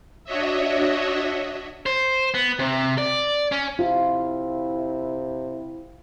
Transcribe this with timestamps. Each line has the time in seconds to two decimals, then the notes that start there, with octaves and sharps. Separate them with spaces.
0.24 D4 F#4 C#5 D#5 E5
1.86 C5
2.34 B3
2.59 C3
2.98 D5
3.52 C#4
3.79 C3 E4 F4